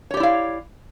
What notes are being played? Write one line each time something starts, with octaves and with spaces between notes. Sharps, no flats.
E4 G4 C#5 D5 F5